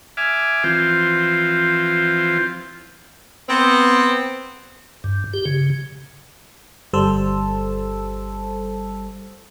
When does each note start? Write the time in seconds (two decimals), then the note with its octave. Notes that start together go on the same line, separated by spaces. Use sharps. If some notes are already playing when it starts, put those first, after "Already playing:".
0.17 E5 G#5 D6 F6
0.64 E3 F3 C4 F4
3.49 B3 C4
5.04 G2
5.33 G4
5.45 C#3
6.93 G1 G3 A4 C5 A5 E6